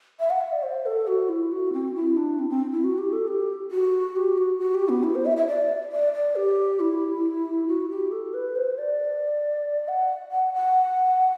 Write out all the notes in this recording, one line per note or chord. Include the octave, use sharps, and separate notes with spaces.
E5
F#5
E5
D5
C5
A4
F#4
E4
F#4
C4
E4
D4
C4
C4
E4
F#4
G4
A4
G4
F#4
G4
F#4
F#4
G4
B3
E4
C5
E5
E5
D5
D5
D5
G4
E4
F#4
G4
A4
B4
C5
D5
F#5
F#5
F#5